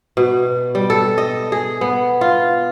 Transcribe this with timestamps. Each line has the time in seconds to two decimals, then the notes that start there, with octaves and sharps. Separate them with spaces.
0.17 B2
0.75 G3
0.90 A4
1.18 D#5
1.52 G#4
1.81 B3
2.21 F4